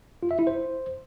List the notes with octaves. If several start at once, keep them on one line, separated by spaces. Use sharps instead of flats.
F4
E5
E4
C5